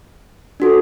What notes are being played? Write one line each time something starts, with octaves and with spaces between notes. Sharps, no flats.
D4 F#4 A4